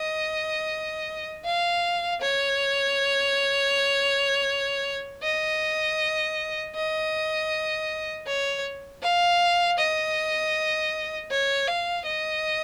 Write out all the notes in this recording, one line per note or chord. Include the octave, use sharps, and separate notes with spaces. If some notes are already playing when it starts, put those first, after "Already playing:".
Already playing: D#5
F5
C#5
D#5
D#5
C#5
F5
D#5
C#5
F5
D#5